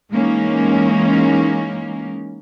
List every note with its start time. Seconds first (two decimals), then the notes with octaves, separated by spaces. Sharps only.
0.11 E3 G#3 A#3 C#4 D#4